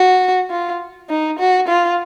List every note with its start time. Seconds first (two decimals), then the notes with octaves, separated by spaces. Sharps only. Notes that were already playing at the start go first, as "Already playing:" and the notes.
Already playing: F#4
0.50 F4
1.09 D#4
1.39 F#4
1.68 F4